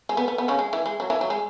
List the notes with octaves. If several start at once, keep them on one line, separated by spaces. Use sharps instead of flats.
G#3
B3
B3
B3
C#3 C#4
G#3
E3
G#3
F#3
E3
F#3
G#3